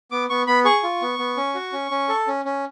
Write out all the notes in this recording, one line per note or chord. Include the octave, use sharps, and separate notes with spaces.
B3 D6
B3 C#6
B3 B5
G#4 C#6
F4
B3
B3
C#4
F#4
C#4
C#4
A4
C#4
C#4